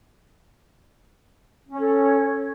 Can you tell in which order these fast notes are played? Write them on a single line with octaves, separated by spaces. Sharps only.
C#4 C#5 A4